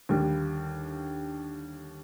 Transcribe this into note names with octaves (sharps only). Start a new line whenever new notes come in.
D#2 D3 G3